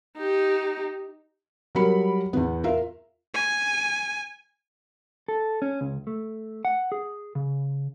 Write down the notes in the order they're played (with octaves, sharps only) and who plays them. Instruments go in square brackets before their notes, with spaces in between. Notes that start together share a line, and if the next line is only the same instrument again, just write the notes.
[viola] D#4 G4
[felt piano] F#3 G3 A#4 B5 C#7
E2 E3 B3
F4 A#4 E5 F5
[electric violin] G#5
[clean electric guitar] A4
C#4
C#2
A3
F#5
G#4
C#3